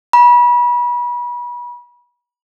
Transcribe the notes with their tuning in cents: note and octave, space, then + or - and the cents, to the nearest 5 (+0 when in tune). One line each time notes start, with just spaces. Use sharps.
B5 -30